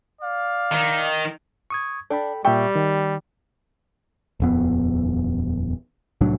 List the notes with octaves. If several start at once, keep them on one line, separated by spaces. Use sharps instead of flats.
D5 F5
D#3
C#6 D#6 G#6
D4 A4 G5 B5
A#2 G3 G4 E5 C#6
D#3
D#1 F2 B3
C2 A2 F#3 D4